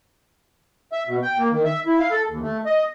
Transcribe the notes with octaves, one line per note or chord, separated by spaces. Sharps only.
E5
B2
G5
A#3
D#3
E5
E4
F5
A4
D#2
A3
D#5